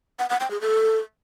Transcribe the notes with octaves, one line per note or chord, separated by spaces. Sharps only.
F#5
F#5
G5
G#4
A4